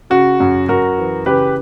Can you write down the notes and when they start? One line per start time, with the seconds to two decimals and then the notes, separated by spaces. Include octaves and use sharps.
0.10 C#3 F#4
0.40 F#2
0.69 F#2 F#4 A#4
0.98 E3
1.26 C#3 G4 B4